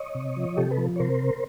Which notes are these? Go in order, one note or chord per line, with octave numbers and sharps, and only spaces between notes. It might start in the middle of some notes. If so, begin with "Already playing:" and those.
Already playing: C#5 D#5
C3
F3
C3 G4 A4
A4 B4
F3
C#5
C3 A#4 C5